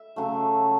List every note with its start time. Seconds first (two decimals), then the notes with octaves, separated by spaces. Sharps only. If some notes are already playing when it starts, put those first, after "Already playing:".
Already playing: E5
0.16 C#3 F#3 A3